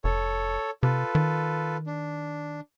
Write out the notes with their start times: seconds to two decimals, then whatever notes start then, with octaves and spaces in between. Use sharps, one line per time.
0.04 F1 A4 C#5
0.83 C3 F4 A4 B4
1.15 D#3
1.86 D4